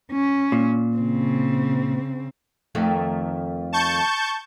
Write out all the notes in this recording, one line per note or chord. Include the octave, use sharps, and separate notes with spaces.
C#4
A#2
C#3 C4
F2 D#3 A3
A5 C#6 G6